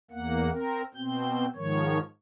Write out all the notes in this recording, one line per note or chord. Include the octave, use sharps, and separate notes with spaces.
E2 A#3 F#5
C4 A#4
B2 C4 G6
G#2 D#3 F3 C#5